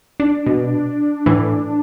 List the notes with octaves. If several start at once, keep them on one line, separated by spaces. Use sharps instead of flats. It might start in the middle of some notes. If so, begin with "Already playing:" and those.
D4
B2
A2 E3